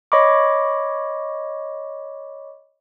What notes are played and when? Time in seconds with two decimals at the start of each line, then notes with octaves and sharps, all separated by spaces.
0.12 C#5 D#5 B5 C#6 D6